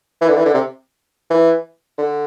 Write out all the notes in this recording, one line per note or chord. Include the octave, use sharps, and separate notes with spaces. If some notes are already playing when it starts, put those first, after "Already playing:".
E3
D3
E3
D3
C3
E3
D3